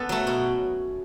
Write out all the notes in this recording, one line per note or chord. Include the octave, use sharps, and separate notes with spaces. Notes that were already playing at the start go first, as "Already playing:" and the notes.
Already playing: B3 C#4 A4 B4 C#5
F#3 A3
B2